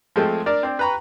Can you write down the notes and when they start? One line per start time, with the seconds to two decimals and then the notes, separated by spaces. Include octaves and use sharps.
0.16 F3 G#3 A3 C4
0.46 D4 A#4 D5
0.63 C4 D4
0.79 B4 G5 A#5 B5 C#6